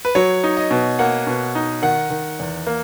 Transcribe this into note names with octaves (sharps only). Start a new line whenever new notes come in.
B4
F#3 C#5
D#4
D#5
B2
A#3 F#5
B2
D#4
D#3 F#5
D#3
E2
A#3